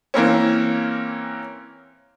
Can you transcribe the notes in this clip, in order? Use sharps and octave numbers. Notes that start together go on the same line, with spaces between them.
E3 A#3 C4 C#4